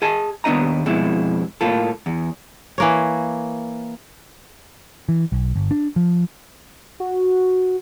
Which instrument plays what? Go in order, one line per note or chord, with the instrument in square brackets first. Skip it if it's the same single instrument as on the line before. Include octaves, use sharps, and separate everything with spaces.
[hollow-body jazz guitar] G#4 D#5 G#5 A5
D#2 B3 D4 D#5 A#5
F2 B2 G#3 E4
A2 A#3 F4 A4
E2
[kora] E3 A#3 C#5
[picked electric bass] E3
B1
G1
D4
F3
[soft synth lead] F#4